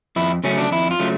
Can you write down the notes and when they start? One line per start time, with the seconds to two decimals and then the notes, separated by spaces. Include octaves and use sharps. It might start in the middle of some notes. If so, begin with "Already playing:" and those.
0.16 F2 E4
0.44 C#3 F#3 A3 C#4
0.58 D4
0.71 F2 E4
0.91 F4
0.99 C#3 F#3 A3